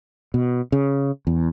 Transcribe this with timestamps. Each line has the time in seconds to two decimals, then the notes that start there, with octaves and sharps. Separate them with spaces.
0.34 B2
0.72 C#3
1.27 E2